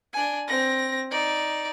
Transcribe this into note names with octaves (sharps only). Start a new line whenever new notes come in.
D4 G#5
C4 A#6
D#4 D5